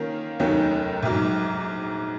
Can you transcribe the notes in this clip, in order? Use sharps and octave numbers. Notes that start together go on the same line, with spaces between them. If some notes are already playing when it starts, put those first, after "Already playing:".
Already playing: D#3 A#3 C#4 F4
F1 D#2 D#3 F#3 C#4
A#1 G#2 F#3